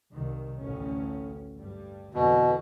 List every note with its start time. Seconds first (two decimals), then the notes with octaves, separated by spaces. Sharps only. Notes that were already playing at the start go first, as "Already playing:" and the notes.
0.13 C2 D#3
0.60 A1 D2 C#4
1.57 G2 G3
2.14 F2 B2 D3 E3